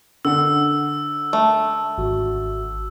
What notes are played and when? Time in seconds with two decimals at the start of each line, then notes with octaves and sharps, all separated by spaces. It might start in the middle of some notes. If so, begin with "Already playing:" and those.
0.25 D3 F#5 E6
1.33 A3
1.98 G#1 F#4